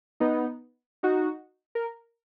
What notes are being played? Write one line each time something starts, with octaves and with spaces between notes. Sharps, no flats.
B3 D#4
D#4 F#4
A#4